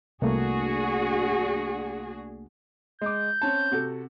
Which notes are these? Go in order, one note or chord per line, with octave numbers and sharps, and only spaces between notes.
C2 A3 A#3 D4 F#4 G#4
G#3 D6 G6
C4 C#4 A5
C3 F#4 A4